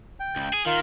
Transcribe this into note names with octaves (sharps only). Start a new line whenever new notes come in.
G5
C#2
G#4
D#3 F4 A#4 F5